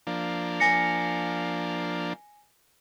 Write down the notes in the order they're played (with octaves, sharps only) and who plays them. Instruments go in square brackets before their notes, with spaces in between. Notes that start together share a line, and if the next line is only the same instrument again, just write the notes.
[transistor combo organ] F3 A#3 D4
[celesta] G#5 A#6 C#7